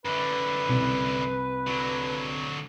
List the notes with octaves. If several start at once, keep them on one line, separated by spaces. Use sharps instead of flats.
F#2 D3 B4
C2
D3 F#3